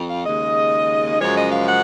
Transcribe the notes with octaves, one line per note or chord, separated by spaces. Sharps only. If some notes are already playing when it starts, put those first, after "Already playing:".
Already playing: F2
F5
D#2 C#3 G#3 D#5
F#2 C#3 F3 G#3 C#5
D#5
F5
F#5